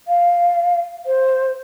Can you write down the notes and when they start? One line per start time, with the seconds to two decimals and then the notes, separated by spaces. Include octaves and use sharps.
0.07 F5
1.06 C5